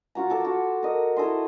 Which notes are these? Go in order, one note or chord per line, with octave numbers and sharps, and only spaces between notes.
F4 F#4 A#5
A4 D6
F#4
A#4 D#5
E4 A4 D#5 C6